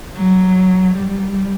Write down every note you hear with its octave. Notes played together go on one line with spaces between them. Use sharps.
F#3
G3